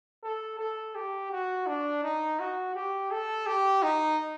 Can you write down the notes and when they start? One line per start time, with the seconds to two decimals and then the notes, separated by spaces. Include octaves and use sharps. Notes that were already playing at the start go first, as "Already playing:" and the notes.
0.23 A4
0.59 A4
0.95 G4
1.32 F#4
1.66 D4
2.03 D#4
2.39 F#4
2.75 G4
3.11 A4
3.46 G4
3.83 D#4